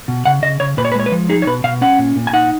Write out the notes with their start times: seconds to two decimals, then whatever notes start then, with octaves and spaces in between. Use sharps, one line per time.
0.08 B2
0.25 C#3 F#5
0.42 C#3 D#5
0.60 C#3 C#5
0.77 A#2 B4
0.85 C#5
0.92 B4
0.95 G#3 C#5
1.06 B4
1.12 F3
1.29 D#4 G#4
1.42 C#5
1.47 B2 B4
1.64 B2 F5
1.81 C#4 F#5
1.98 A#2
2.16 A#2
2.27 G#5
2.33 D#4 F#5